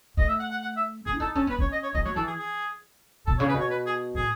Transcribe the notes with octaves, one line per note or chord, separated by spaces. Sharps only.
A3 D#5
E5
F#5
F#5
F#5
E5
A3 G#4
E4
D#4 A4
C#4 A4
B3 B4
C#4 C#5
D#5
C#5
A3 D#5
F#3 C#5
E3 A4
G#4
G#4
B2 A4
C#3 C#5
B4
B2
C#5
B4
G#4
A2 G#4